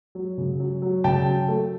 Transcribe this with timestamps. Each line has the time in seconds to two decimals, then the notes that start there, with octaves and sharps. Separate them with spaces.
0.15 F#3
0.38 C#3
0.60 F#3
0.82 F#3
1.04 C#3 G5 A5
1.26 F#3
1.48 A3